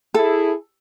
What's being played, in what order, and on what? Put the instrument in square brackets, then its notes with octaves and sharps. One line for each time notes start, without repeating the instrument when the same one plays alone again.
[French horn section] E4 G#4 [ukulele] A4